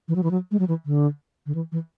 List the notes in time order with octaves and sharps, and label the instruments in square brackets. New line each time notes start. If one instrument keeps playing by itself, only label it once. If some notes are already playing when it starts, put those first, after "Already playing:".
[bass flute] E3
F#3
E3
F#3
G#3
F#3
E3
D3
D3
E3
E3